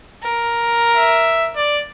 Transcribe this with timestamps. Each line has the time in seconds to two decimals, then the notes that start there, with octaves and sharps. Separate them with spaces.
0.23 A#4
0.96 E5
1.56 D5